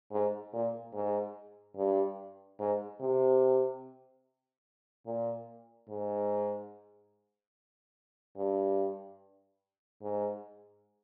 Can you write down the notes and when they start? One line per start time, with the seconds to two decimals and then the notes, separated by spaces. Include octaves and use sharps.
0.11 G#2
0.53 A#2
0.93 G#2
1.76 G2
2.59 G#2
3.00 C3
5.06 A#2
5.89 G#2
8.36 G2
10.02 G#2